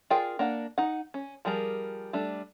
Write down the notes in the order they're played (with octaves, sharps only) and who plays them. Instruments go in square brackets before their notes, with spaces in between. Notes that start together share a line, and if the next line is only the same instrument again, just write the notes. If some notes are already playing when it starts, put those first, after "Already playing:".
[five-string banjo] F4 G#4 A#4 D5 G5
A#3 D4 F#5
D#4 F#5
C#4
F3 G3 G#4 A#4
G3 A3 D4